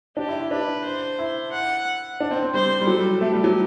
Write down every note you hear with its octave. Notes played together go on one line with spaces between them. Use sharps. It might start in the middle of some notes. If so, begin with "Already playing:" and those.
D4 G4
E4
E4
D4 B4
C5
E4
F#5
D4
C4
C4
G3 C5
G3
F#3 A4
G3
A3 G4
G3
F#3